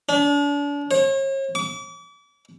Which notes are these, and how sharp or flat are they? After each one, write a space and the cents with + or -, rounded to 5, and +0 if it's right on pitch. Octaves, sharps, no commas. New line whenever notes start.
D4 -35
C#5 -40
D6 -40